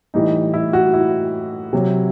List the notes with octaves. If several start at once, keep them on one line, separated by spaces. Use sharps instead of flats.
A2 E3 G3 D#4
E4
F#4
E4
C3 F#3